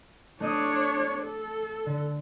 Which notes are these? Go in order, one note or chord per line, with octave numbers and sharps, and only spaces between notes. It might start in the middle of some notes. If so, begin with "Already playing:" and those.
A3 D4 C#5 D#5 D#6
A4
D3